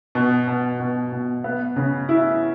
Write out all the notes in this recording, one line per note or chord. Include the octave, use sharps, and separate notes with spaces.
B2
B2
B2
B2
B3
C#3
E4